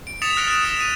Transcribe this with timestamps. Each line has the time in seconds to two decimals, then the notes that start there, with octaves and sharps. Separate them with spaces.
0.07 D7
0.22 D#6 A6 B6 C#7 E7 F7
0.37 F6 F#6 A#6 C#7 D7
0.48 F#6 D7
0.65 D#6 B6 D7 E7
0.80 D#7